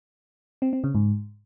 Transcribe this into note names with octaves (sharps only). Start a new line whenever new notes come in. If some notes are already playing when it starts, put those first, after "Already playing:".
C4
C4
C#3
G#2